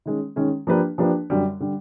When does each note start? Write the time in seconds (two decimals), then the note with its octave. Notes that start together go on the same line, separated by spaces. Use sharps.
0.06 D#3 G#3 C#4
0.36 D#3 G#3 C#4
0.67 F3 A#3 D4 G4 B4
0.98 F3 A#3 D4 G4 B4
1.30 F#2 D3 G3
1.60 D3 G3